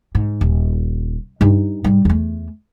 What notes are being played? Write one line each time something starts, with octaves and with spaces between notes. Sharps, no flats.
G#2
D#1
G2 D#4
G#2 G3
E2 A3